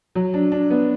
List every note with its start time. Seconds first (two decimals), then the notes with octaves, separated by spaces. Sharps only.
0.15 F#3
0.34 D4
0.52 D4
0.70 B3